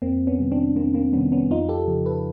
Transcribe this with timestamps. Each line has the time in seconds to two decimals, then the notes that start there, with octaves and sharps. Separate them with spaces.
0.02 F2 A#3 C4
0.27 B3 C#4
0.39 C3 D#3 G3
0.52 C4 D4
0.76 F2 A#3 C4
0.94 A#3 C4
1.13 C3 D#3 G3 B3 C#4
1.32 B3 C#4
1.51 F2 D#4 F4
1.69 G4 A4
1.88 C#3 F3
2.06 A4 B4